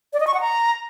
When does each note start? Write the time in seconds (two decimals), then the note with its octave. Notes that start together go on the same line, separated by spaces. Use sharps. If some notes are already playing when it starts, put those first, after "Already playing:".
0.13 D5
0.20 D#5
0.27 C#6
0.34 F#5
0.41 A#5